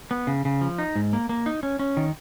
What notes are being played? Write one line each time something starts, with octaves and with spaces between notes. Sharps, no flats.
B3
C#3
C#3
F3
D#4
G#2
A#3
A#3
D#4
C#4
C#4
D#3